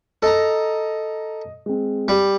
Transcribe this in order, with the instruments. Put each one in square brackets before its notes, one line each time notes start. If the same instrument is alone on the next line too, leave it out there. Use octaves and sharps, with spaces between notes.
[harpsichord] A4 A#5 [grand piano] D#5
[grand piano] G#3 C4
[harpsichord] G3